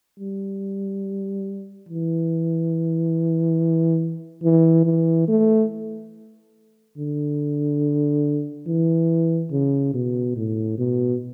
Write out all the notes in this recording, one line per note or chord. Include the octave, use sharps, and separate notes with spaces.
G3
E3
E3
E3
A3
D3
E3
C#3
B2
A2
B2